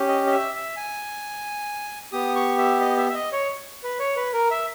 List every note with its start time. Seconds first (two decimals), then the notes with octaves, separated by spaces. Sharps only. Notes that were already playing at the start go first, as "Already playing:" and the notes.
Already playing: C#4 G4
0.08 D#5
0.27 D#5
0.31 E5
0.55 E5
0.76 G#5
2.12 B3 G4 D#6
2.36 C#6
2.58 E5
2.81 D#5
2.97 E5
3.10 E5
3.14 D#5
3.32 C#5
3.83 B4
3.99 C#5
4.16 B4
4.33 A#4
4.51 E5